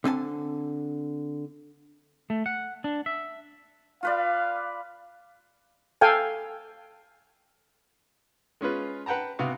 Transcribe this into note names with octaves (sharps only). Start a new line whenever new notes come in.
D3 C4 G#5 A5
A3
F#5
D4
E5
F4 B4 D5 F5
A4 F5 G5 G#5
G#3 C#4 F4 B4
B4 F#5 G5 A5 A#5
C3 B3 F#4 F5 D#6